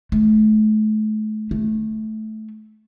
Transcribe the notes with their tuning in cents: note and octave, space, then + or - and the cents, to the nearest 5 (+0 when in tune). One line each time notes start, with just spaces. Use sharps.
A3 -35
A3 -15